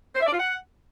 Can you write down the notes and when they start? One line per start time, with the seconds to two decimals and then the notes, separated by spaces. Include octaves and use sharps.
0.15 C5
0.21 E5
0.27 D5
0.33 F4
0.39 F#5